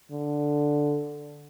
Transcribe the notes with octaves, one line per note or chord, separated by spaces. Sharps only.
D3